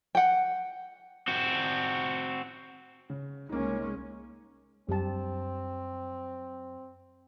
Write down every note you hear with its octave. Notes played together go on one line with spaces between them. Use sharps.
F#5 G5
C4 F#4
C#3
C2 G#3 A#3 C#4 D#4
F#2 G3 C4 G4 A5